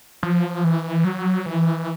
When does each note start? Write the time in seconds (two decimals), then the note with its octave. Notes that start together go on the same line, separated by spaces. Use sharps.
0.23 F3
0.64 E3
1.04 F#3
1.46 E3